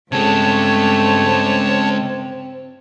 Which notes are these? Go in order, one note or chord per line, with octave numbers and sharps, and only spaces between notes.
G2 C#3 G#3 A3 C4 C#5 A5